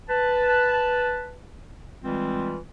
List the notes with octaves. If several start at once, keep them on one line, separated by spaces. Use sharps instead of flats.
B4 A5
E3 G3 G#3 C4 F4